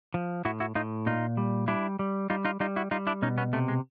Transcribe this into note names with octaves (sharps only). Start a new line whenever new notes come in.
F3
A2 E4 F#4
E4 F#4
A2 D#4 F4
A#2 D#4 F4
G3
G3 D4 E4
G3
G3 D#4 F4
D#4 F4
G3 D#4 F4
E4 F#4
G3 D#4 F4
D4 E4
B2 C#4 D#4
B3 C#4
C3 A3
G#3